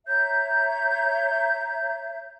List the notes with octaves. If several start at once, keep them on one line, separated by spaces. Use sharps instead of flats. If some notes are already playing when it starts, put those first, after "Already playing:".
C#5 E5 A#5 G6